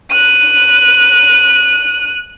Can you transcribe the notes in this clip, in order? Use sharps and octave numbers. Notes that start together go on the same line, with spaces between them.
F#6 D#7